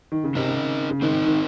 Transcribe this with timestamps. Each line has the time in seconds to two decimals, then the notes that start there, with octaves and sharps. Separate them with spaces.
0.12 D#3
0.24 C#3
0.35 C3 C4 D#4 A#4 D#5
0.48 C#3
0.91 C#3
1.02 D#3 C4 D#4 A#4 D#5
1.25 D#3